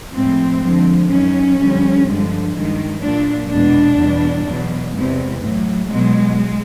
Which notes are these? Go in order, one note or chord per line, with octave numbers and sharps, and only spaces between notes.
A2 F3 G#3 C4
F2 D3 F3 G#3
F#2 D#3 F#3 C#4
F2 D3 G3
G2 D3 F3 G#3
G2 D#3 G#3
A#2 F#3 D4
E2 B2 G#3 D4
E2 B2 G3
E2 B2 F#3
E2 C3 E3 G#3
A2 F#3
B2 F#3 G#3